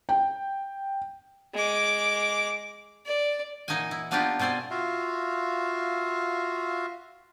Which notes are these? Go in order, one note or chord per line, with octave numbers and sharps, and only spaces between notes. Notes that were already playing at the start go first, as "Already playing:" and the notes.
G5
G#3 D6
D5
A#2 E3 D#4 D#5 F#5 G#5
E4
A#3 B3 D4 D#4 F4 G4
B2 C4 C5 D5 G#5
F4 F#4 E5 F5